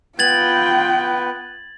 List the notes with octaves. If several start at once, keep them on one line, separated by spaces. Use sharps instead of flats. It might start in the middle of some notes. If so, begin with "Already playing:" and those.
B3 F4 B4 G5 G#6 A6 F#7